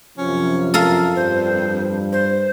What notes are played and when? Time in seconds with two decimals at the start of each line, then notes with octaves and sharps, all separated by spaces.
0.18 F#2 C3 F3 C#4
0.74 F2 A4 A#4 F5
1.16 G2 C5
2.12 C5